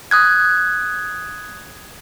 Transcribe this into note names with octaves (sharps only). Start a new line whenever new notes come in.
D#6 F#6 G#6